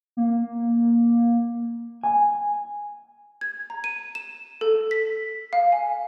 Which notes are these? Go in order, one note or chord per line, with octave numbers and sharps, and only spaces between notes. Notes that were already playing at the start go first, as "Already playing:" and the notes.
A#3
G#5
G#6
A#5
D#7
E7
A4
B6
F5
G#5